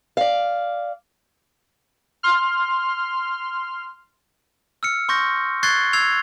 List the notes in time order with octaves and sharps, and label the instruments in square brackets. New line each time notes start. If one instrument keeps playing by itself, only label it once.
[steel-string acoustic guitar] D5 F5
[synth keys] C6 F6
[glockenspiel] E6 F6 C#7
C6 C#6 G6 A#6
C#6 F#6 G#6 A6 C7 G7
E6 G#6 C7 F7